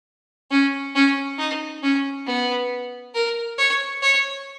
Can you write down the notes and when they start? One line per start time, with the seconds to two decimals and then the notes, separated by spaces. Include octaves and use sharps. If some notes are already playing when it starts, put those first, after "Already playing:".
0.51 C#4
0.95 C#4
1.38 D#4
1.83 C#4
2.26 B3
3.14 A#4
3.58 C#5
4.02 C#5